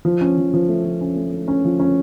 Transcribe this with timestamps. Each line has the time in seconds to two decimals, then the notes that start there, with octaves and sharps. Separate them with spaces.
0.05 F3
0.21 C#4
0.38 F3
0.54 F3
0.69 A3
0.85 F3
1.01 C#4
1.16 A3
1.32 A3
1.48 C#4
1.65 F3
1.80 C#4